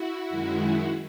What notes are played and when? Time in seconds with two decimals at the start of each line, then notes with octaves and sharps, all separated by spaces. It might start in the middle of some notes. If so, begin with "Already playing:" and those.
Already playing: E4 F#4
0.30 F#2 D#3 G#3